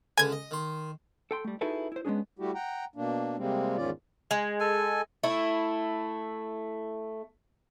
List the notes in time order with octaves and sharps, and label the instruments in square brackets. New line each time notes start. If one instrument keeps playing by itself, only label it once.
[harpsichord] C#2 D3 B4 [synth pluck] G#5 G#6
[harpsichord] D#5
D#3 C6
[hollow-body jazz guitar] A4 G5 C6
G3 A3
D#4 E4 F#4 G#4 A4 B4
E4 C5
G#3 B3 C#4 D4 G#4
[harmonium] G3 A3 E4 F#4 G4
F#5 G5 A#5
B2 A#3 D4
C3 G3 G#3 A#3 C4
E2 G#2 D#3 C#4 F4 D5
[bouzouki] G#3
[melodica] A4 G#5
[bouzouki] A3 E4